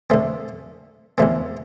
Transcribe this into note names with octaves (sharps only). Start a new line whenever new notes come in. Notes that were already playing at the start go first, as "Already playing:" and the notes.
D3 A3 C4
E2 D3 A3 C4